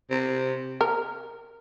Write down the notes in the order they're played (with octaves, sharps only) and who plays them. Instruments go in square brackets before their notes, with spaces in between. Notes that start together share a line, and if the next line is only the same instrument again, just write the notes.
[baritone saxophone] C3
[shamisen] A#4